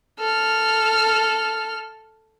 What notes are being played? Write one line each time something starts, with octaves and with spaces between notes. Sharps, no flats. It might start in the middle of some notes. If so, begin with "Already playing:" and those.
A4 F6